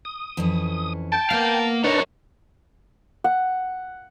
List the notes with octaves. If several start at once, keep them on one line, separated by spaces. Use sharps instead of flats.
D#6
F2 E3 C#4
G5 A5
A#3 B3 F5
D4 D#4 A#4 B4 C#5 A5
F#5